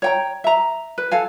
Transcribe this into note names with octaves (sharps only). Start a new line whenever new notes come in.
C#5 G5 A#5
E5 A#5
B4
A4 F5 G#5